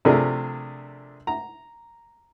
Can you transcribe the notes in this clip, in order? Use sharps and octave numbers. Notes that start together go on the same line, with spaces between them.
C3 F3 A3 D4 G#4 A#4
A#5